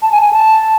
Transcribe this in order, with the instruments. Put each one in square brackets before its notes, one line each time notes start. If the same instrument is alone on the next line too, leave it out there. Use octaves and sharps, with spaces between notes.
[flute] A5
G#5
G#5
A5